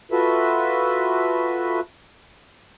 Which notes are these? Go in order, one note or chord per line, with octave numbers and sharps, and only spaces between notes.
F4 F#4 A4 B4 E5